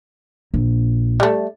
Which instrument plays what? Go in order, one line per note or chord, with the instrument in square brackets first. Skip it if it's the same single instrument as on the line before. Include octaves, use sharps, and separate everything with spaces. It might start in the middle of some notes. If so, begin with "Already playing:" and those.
[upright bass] A#1
[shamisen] G3 A3